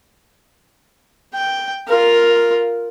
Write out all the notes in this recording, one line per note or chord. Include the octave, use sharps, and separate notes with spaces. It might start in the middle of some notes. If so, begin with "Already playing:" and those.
G5
F4 A#4